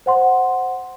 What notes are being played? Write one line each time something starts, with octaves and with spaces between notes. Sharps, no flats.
C5 F#5 C6